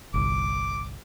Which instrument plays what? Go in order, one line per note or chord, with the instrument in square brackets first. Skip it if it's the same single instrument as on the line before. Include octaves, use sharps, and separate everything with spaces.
[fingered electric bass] G1 C2 [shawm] D6